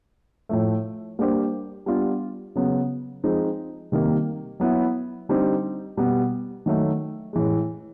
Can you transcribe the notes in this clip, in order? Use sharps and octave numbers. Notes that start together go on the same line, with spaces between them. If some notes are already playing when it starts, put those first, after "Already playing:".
A2 F3 A3
G3 A#3 D4 G4 C5
G3 B3 D4 F4
C#3 F#3 B3
F3 G#3 C4 D#4
C3 D#3 G3 A#3
F#3 B3 E4
D3 G3 C4 D#4
B2 G3 B3
D#3 F#3 A3
A2 E3 G#3